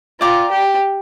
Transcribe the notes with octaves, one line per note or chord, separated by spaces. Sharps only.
F4 D5 G5 A#5 D6
G4